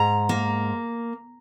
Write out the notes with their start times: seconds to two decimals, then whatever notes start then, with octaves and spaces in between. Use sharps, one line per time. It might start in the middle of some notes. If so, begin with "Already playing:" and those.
Already playing: G#2 A#5
0.29 A#3